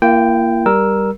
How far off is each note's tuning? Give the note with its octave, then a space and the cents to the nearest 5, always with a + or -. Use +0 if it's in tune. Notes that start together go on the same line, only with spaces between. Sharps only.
A#3 +0 E4 +45 G5 +0
G3 +0 A#4 +10 E6 +0